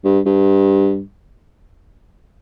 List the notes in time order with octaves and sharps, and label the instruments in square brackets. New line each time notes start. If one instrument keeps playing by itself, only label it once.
[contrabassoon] G2
G2